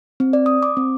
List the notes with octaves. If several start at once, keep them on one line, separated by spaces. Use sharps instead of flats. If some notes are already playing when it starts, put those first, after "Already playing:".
C4
D5
D#6
D6
C4